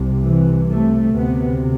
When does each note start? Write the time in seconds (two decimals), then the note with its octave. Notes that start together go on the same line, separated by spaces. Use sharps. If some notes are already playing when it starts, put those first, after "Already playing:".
Already playing: C2 C3
0.25 E3
0.70 A3
1.15 D2 C3 B3